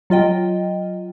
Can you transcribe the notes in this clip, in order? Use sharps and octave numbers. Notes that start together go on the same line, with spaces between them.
F#3 F4 D#5 G5